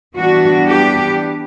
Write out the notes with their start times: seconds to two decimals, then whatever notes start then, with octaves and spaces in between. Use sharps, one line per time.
0.16 E3 G3 B3 D4 F#4
0.67 G4